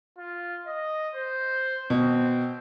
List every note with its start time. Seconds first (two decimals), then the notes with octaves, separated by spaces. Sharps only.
0.18 F4
0.67 D#5
1.15 C5
1.90 B2 C4